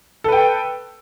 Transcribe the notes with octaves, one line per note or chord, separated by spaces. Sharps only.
A4 B4 G5